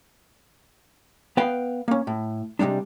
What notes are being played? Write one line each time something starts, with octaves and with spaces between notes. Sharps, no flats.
B3 B4 F5 G5
A#3 C#4
A2
C3 F3 G3 G#3 D4